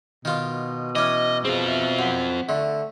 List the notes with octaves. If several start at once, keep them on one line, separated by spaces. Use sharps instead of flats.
B2 D#3 F4
E3 C#4 D#5 D6 F6
C4 F4 G#4
E5
F#2 F#5 B6
D3 A3